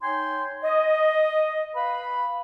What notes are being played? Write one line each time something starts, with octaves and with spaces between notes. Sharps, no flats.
D#4 C#5 G5 G#5 C6
D#5
B4 F5 B5